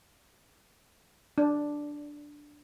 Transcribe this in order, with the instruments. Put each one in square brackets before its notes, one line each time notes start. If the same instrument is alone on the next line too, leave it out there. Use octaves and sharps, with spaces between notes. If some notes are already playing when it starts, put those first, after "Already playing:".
[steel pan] D4